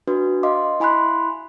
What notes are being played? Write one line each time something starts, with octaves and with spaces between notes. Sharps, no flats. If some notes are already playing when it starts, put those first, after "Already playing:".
D4 F#4 B4
D#5 F5 C6 D6
E4 G#5 B5 C6 F#6